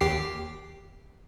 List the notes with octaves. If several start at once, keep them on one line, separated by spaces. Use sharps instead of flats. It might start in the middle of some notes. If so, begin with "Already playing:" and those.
D#2 G4 C7